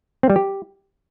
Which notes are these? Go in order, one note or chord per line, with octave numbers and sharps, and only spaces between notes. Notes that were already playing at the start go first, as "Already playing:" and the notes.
C4
G3
G4